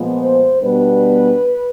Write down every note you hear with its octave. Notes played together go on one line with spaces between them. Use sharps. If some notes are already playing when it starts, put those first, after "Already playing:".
Already playing: A#2 F3 G#3 B3
C5
B2 G3 B3 D4 B4